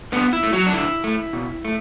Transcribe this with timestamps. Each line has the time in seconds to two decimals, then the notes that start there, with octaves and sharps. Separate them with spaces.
0.12 D3 B3 B4
0.33 E4
0.43 A3
0.53 F#3 F#4
0.66 D4
0.73 D3 E4
1.04 A3
1.33 B2
1.65 A3